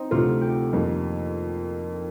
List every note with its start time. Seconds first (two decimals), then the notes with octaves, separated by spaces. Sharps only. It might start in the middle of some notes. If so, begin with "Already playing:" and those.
Already playing: C4 D#4
0.11 D2 C3 F3 A3 F4
0.41 G4
0.73 F2 D#3 A#3